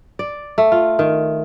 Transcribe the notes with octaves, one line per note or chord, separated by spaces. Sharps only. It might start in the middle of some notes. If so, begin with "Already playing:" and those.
D5
A3
F4
D#3